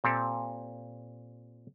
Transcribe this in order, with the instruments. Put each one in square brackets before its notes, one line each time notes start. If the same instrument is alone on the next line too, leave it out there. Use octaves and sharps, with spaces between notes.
[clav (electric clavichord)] A#2 C4 G4 A4 F5